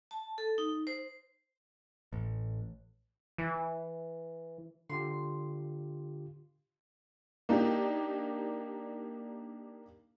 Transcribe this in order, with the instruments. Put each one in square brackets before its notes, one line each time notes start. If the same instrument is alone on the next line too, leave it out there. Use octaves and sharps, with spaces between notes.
[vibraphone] A5
A4
D#4
C5
[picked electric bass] A1
[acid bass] E3
[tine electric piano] D3 F4 G4 [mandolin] C6
[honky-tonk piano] A#3 D4 D#4 G4